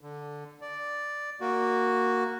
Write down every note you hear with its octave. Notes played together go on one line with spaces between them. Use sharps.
D3
D5
A#3 F#4